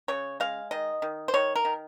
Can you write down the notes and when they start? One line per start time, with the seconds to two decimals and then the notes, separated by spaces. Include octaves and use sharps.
0.08 C#3 C#5
0.40 G#3 F5
0.71 D#3 D#5
1.02 D#3
1.28 C5
1.34 D#3 C#5
1.56 A#4
1.65 D#3